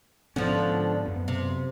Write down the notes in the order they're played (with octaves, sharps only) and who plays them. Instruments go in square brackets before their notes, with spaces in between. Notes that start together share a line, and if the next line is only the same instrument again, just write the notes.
[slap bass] G#2 B3 C#4 [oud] D3 F3
[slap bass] F#2 B3
[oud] C3